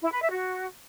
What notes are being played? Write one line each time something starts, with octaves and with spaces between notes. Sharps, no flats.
E4
B4
E5
F#4